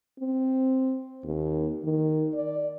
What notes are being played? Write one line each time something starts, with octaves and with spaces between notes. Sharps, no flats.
C4
D#2
D#3
D5